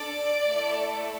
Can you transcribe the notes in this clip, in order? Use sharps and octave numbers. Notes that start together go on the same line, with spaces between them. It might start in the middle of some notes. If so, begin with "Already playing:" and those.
Already playing: D4 A4 D5
A3 E4 A4